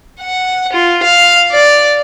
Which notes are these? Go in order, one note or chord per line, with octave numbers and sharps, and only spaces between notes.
F#5
F4
F5
D5